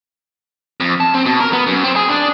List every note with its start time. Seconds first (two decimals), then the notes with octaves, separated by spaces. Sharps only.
0.80 F2
1.00 A5
1.14 C4
1.26 B2
1.40 A#4
1.53 B3
1.67 F#2
1.84 C4
1.96 G#4
2.09 D4